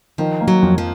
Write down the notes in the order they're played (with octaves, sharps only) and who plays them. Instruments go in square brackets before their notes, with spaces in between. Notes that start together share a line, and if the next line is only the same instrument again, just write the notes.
[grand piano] D#3 [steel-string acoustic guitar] F3
[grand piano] A#3
[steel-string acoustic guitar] F#3
[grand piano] F2
[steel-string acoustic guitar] F3